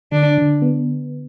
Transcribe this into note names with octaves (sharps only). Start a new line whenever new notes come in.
D3 D4
D3
B3